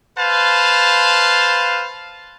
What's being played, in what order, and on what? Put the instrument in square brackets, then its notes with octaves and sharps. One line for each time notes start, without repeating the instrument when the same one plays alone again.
[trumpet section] B4 C5 F5 A5